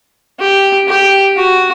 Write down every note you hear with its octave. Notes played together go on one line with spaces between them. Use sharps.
G4
G4
F#4